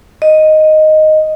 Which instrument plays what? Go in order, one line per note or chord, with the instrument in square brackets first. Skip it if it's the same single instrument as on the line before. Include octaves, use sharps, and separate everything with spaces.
[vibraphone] D#5